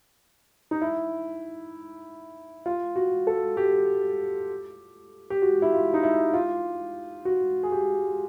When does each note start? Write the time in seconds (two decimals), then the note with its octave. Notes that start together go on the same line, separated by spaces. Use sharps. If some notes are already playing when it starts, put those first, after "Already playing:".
0.71 D#4
0.82 E4
2.66 F4
2.96 F#4
3.27 A4
3.57 G4
5.30 G4
5.42 F#4
5.62 E4
5.73 F4
5.94 D#4
6.03 E4
6.34 F4
7.25 F#4
7.63 G#4
7.72 G4